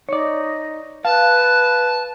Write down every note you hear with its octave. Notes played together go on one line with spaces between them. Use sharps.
D#4 C#5 D5
B4 F5 A5